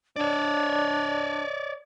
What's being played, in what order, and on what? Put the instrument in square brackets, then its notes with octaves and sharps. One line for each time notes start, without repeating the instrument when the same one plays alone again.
[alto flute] D4 [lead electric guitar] C#5 D5